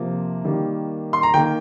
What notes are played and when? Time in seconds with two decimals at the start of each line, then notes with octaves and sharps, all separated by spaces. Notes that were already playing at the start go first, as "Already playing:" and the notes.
Already playing: C3 F3 A#3
0.44 D#3 G3 A#3
1.13 C6
1.23 A#5
1.34 D#3 A#3 G5